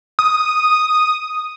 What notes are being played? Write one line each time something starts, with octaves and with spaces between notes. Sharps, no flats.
D#6